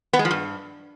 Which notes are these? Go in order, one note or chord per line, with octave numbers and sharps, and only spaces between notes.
B3
G#3
F3
G2